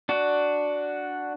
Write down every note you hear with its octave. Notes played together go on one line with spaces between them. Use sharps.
D4 F#4